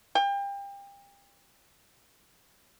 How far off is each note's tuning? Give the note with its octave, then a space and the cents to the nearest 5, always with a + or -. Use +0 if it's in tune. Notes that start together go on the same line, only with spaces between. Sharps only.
G5 +30